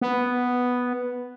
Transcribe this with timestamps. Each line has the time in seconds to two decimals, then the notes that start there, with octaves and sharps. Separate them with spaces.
0.01 B3